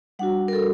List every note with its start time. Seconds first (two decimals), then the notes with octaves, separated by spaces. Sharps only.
0.19 G3 D4 F#4 F#5
0.48 A#4
0.53 A4